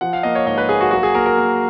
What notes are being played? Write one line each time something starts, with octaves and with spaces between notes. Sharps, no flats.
F3 F#5
F5
A#3 D#5
C#5
G#2 D#5
B4
A#3 G#4
F#4
F#3 F#4
G#4
A#3 A#4
A#4
A#3